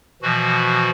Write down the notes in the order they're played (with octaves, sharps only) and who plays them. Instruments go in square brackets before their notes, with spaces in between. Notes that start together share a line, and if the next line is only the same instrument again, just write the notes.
[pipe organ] B2 E3 F3 F#4